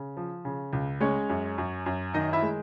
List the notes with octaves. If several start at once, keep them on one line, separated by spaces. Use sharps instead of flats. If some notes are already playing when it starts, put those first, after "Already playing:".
Already playing: C#3
F3
C#3
C#2
G#3 C#4 C#5
F#2
F#2
F#2
D#3 D#4 D#5
E4 E5
G#3